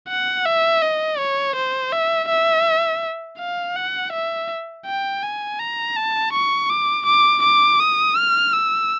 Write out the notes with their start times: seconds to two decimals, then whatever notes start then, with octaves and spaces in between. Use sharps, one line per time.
0.08 F#5
0.45 E5
0.82 D#5
1.18 C#5
1.56 C5
1.92 E5
2.28 E5
3.38 F5
3.76 F#5
4.13 E5
4.86 G5
5.23 G#5
5.59 A#5
5.96 A5
6.33 C#6
6.70 D6
7.06 D6
7.43 D6
7.80 D#6
8.16 F6
8.53 E6